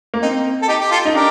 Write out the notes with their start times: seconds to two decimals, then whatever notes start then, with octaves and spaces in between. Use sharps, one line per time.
0.14 A#3
0.22 C4 D#4
0.62 A4
0.68 D#4 G4
0.80 G4
0.91 F4 A4
1.05 D#4
1.15 D4 G4 A#4